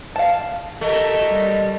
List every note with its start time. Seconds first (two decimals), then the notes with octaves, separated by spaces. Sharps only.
0.16 F5 A5
0.81 A3 G4 A#4 D#5
1.26 G3